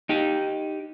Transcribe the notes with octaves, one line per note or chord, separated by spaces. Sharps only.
D#4 G4